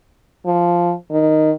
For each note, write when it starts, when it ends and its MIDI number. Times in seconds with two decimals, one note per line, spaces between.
0.46 0.94 53
1.11 1.51 51